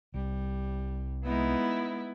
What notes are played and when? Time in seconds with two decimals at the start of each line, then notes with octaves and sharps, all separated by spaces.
0.14 C2 G3
1.25 G#3 B3 D#4 E4